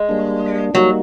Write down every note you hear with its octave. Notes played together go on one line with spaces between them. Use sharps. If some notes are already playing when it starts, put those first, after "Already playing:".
Already playing: G#3
G3 A#3 D4
F#3 G3 A#3 D#4 F#4